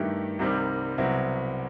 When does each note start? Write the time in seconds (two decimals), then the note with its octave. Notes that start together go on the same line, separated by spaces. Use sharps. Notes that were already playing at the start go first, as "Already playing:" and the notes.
Already playing: G2 D#3 A3 E4 G4
0.39 C2 C3 D#3 G3 C4
0.98 C2 B2 F#3 C4 E4